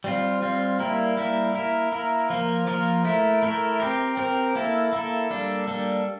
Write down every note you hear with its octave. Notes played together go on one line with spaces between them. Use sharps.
G3 C4 F4
G3 C4 F4
G3 A#3 E4 A#4
G3 A#3 E4 A#4
A#3 E4 A#4
A#3 E4 A#4
F3 A#3 F4 A#4
F3 A#3 F4 A#4
A3 E4 A#4
A3 E4 A#4
C4 G4 A#4
C4 G4 A#4
A#3 E4 A4
A#3 E4 A4
G3 A#3 D4 A4
G3 A#3 D4 A4